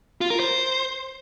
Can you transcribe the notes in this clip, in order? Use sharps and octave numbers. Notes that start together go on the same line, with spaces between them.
F4
A#4
C5